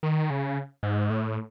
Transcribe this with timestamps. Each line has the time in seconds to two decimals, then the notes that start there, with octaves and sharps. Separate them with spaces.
0.03 D#3
0.30 C#3
0.83 G#2
1.10 A2